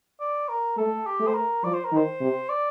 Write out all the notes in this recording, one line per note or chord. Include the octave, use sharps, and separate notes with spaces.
D5
A#4
A3 A4
G4
A3
C5
A#4
F3 D5
C5
A#4
D#3
C5
C3
D5